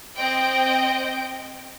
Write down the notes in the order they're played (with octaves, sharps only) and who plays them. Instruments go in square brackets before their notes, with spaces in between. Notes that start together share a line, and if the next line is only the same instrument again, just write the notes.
[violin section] C4 D#5 G5 D7